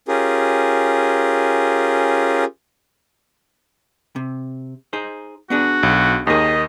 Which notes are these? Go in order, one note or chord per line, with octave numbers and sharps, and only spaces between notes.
C#4 F4 G4 G#4 A#4
C3
D#4 G#4 C5
B3 D4 F#4 G#4
B1
D#2 D#3 D#4 G#4 D#5